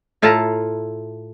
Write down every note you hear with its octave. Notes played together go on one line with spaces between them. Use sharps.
A2 E4 F4 A4 A5 A#5